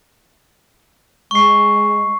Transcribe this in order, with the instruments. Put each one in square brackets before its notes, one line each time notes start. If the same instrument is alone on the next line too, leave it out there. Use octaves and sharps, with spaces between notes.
[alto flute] G#3 [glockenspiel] C#6 C7